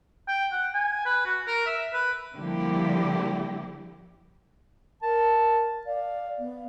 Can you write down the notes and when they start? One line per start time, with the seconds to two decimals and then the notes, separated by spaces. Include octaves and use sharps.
0.28 G5
0.52 F#5
0.74 G#5
1.05 B4
1.25 F#4
1.47 A#4
1.67 E5
1.93 B4
2.36 D3 F3 G3 A#3 E4 G4
5.02 A#4 A5
5.86 D5 F5
6.39 B3